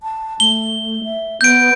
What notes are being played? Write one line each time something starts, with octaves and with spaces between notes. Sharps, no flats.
A5
A3 G7
E5
B3 G6 D7